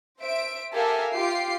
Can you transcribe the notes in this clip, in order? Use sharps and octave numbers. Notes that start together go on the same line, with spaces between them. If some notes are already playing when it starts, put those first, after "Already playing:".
C5 E5 D7
G4 A4 A#4 E5 F5 G#5
F4 G4 C7 D7